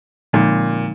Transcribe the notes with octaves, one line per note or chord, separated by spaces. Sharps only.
A#2 D3 F3 G#3 C4 D#4